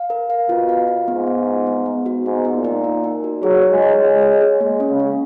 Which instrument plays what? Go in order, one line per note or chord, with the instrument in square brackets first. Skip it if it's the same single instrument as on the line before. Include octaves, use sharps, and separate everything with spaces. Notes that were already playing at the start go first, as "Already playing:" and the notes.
Already playing: [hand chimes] F5
A#4
F5
[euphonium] B2 [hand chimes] F4
[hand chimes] F5
F4
[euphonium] G#2 [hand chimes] B3
[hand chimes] B3
D#4
B3
B3
F#4
[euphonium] G#2 [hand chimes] B3
[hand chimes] D#4
[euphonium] A#2
[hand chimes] D#4
D#4
D#4
F#4
[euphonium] F#3 [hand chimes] G#4
[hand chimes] C#5
[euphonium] G#3
[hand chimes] C#5
[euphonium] G#3 [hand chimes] C#5
[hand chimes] C#5
G#4
[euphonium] G#3 [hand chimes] A#3
[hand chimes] C#4
[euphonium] C#3
[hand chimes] C#4